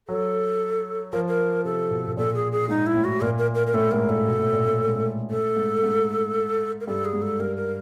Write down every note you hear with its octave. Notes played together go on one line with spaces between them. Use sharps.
F#3 A4
F3 A#4
A#4
C3 A4
B2
B2
A#2 A4
G#4
G#4
G#2 D#4
E4
A2
F#4
A#2 A#4
A#4
A#4
A#4
A2 A4
G#2 A#4
A#2 A4
B2
A2
A#2
A2
A2
G#2
A2
A2 A4
G#2
G#2
A#4
G2 A4
G#4
G#2
A4
G2 A#4
A#4